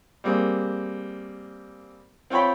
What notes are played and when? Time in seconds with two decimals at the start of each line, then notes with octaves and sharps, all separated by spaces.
0.24 G3 A#3 C4 G#4
2.30 C4 F4 C#5 G5 B5